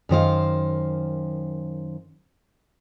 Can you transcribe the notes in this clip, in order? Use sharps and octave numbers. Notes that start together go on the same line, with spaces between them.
F#2 D#3 C5 F5